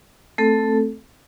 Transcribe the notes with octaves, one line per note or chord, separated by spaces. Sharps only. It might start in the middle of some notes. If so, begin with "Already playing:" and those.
A3 C4 A4